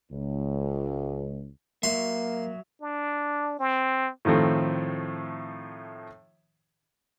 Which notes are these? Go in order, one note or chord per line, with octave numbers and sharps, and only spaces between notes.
C#2
F#3 A#3 F#4 E5 C6
D4
C4
A2 D#3 F3 A3 C4